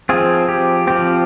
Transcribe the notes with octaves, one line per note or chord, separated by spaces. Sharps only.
F3 C4 F4 G#4
G4
F3 C4 G4